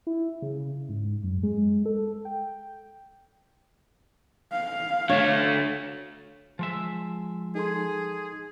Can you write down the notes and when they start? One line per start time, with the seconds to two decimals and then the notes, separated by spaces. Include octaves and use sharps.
0.07 E4
0.42 C#3
0.89 G#2
1.23 F#2
1.43 G#3
1.86 A4
2.25 G5
4.52 F5
5.09 D3 A3 C#5
6.59 F3 G#3 E5
7.55 D#4 G#4 A4 C6